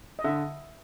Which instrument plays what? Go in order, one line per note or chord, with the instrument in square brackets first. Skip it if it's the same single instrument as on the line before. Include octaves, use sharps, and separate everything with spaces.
[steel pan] D#5
[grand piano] D3 [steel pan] E5